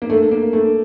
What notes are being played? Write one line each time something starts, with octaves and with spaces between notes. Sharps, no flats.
A#3
A3
A#3
A3